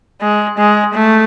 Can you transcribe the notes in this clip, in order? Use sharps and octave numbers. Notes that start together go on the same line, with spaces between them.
G#3
G#3
A3